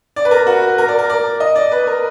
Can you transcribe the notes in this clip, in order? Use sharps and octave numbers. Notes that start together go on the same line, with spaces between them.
D5
B4
A#4
F#4
A#4
D5
A#4
D5
D#5
D5
B4
A#4